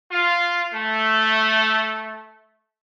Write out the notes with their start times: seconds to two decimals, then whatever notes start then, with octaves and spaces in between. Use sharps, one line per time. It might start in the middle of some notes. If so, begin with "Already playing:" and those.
0.12 F4
0.74 A3